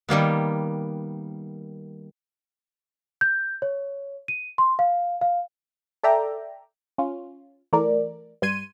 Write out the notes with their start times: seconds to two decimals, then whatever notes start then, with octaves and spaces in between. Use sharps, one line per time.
0.09 D#3 G3 A#3 B3
3.21 G6
3.62 C#5
4.28 D#7
4.58 C6
4.79 F5
5.21 F5
6.03 A4 D5 E5 G5 A#5
6.98 C#4 F4
7.73 E3 A3 A#4 D5
8.42 G2 G3 C6 G#6 D#7